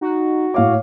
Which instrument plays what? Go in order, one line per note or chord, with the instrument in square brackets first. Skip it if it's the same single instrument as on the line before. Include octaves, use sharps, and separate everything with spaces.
[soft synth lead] D#4 [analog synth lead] F#4
[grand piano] A2 F5 D6 [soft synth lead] C#5